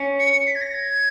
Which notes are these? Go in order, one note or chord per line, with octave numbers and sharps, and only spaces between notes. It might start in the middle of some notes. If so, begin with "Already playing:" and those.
Already playing: C#4
C#7
C#7
B6
G#6
A#6
G#6